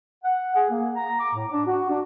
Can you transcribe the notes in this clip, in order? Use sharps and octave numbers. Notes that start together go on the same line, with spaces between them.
F#5
G#4
A#3
A#5
D6
A2
D4
F#4
D4